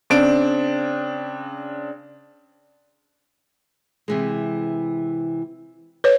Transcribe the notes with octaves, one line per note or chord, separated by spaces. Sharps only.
C#3 C4 D4 D7
C3 E3 G#3
B4 C#5